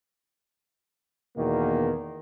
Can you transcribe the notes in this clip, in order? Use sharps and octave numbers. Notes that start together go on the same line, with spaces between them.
E2 B2 D#3 A#3